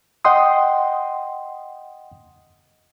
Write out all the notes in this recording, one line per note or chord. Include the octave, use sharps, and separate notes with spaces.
D#5 F#5 G5 C6 D#6